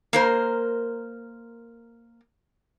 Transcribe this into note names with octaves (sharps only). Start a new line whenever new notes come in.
A#3 A#4 C5